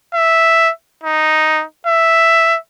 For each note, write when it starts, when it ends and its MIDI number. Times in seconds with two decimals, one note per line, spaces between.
0.14 0.70 76
1.03 1.63 63
1.87 2.57 76